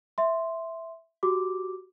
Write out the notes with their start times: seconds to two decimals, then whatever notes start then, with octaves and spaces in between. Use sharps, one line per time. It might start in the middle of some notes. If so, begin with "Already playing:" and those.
0.18 E5 C6
1.23 F#4 G4 D6